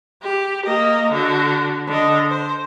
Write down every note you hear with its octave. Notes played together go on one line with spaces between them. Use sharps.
G4
A#3 D#5
D3 F#4
D3 D#5
C5